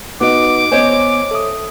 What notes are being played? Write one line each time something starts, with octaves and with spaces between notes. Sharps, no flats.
B3 D#4 F#4 D#5 D6
B3 C5 C#5 D#5 G#5
A4 E5 D#6